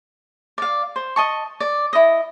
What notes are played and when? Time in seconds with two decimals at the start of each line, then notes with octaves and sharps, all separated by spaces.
0.58 D5 F5
0.96 C5
1.16 D#5 A5 C#6
1.60 D5
1.93 E4 D#5